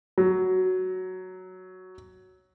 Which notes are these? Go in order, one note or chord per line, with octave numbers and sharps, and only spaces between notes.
F#3